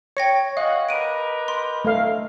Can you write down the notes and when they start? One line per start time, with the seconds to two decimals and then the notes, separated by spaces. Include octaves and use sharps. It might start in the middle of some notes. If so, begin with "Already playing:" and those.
0.17 C#5 G5 A#6 C#7
0.57 C#4 F#4 D#5 F5
0.89 G4 A#4 B4 D7 D#7
1.48 C6
1.85 A3 F5